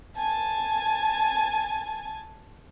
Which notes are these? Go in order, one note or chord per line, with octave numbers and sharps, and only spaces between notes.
G#5 A5